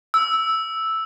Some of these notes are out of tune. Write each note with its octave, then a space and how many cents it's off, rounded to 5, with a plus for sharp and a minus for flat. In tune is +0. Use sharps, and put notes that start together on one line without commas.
E6 -5